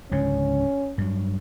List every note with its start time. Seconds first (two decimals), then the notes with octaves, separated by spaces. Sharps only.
0.11 C#2 G#2 D3 C#4
0.98 G2 F#3